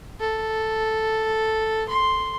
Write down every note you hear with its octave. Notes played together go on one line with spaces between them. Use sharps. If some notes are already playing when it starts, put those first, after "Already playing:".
A4
C6